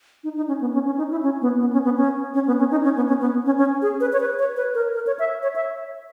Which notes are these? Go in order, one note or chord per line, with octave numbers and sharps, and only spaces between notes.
D#4
D#4
C#4
B3
C#4
C#4
D#4
E4
C#4
B3
B3
C#4
B3
C#4
C#4
B3
C#4
D#4
C#4
B3
C#4
B3
C#4
C#4
G#4
B4
C#5
B4
C#5
B4
A#4
A#4
C#5
E5
C#5
E5